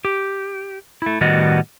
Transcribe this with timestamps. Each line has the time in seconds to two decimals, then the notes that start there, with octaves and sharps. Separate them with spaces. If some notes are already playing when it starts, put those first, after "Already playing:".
0.05 G4
1.02 A3 E4
1.21 A2 D#3 G3 B3 F#4 D#5